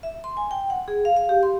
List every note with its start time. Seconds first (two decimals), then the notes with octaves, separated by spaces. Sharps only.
0.03 E5
0.24 C6
0.37 G#5
0.51 G5
0.70 F#5
0.88 G#4
1.05 F5
1.16 F5
1.29 G4
1.43 C6